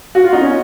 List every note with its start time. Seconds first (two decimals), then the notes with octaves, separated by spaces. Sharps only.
0.15 F#4
0.24 F4
0.33 D#4
0.41 C#4